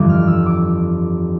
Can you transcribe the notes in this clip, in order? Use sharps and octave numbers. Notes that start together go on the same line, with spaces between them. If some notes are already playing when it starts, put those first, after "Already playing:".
Already playing: G1 F2 E3 D6
F6
E6
D6